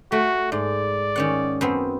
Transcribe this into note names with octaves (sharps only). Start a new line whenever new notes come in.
A3 F#4
G#2 D5
D#3 C#4 F#5
F#2 B3 C4